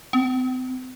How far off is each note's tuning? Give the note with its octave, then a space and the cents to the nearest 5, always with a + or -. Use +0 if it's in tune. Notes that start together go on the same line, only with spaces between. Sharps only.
C4 -40